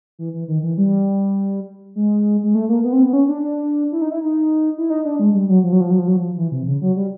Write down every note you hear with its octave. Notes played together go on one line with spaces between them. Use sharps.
E3
E3
D#3
E3
G3
G#3
G#3
A3
A#3
B3
C4
B3
C#4
D4
D4
E4
D#4
E4
D#4
E4
D#4
D4
G#3
G3
F#3
F3
F#3
F3
F#3
F3
F#3
F3
E3
C3
C#3
F#3
G3